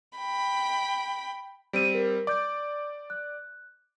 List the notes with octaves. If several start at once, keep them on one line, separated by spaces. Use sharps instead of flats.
G5 B5
G3 C4 D7 D#7
A#4
D5 D6 G6
F#6